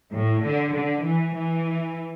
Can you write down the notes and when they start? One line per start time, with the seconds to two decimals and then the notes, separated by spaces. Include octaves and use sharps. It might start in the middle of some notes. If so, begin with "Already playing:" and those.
0.13 A2
0.44 D3
0.74 D3
1.04 E3
1.35 E3